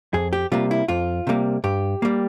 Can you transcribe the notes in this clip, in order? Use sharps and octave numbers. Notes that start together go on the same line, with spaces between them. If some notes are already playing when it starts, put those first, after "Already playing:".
F2 G#4
G4
C3 G3 A#3 F4
E4
F2 F4
C3 G3 A#3
G2 G4
G3 A#3